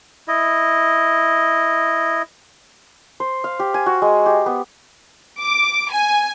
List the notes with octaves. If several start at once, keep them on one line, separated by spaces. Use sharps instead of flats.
E4 D#5
C5
F5
G4
G#5
F#4
G#3
G4
B3
D6
G#5